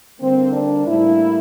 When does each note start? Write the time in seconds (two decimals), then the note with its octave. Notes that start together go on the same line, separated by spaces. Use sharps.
0.20 D3 G3 A#3 C4
0.53 D4
0.87 A2 G3 A#3 E4